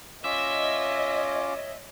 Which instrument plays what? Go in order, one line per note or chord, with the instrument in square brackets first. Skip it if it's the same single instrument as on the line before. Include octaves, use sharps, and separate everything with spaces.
[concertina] C#4 F4 D6 [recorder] C#5 [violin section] D#5 [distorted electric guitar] E5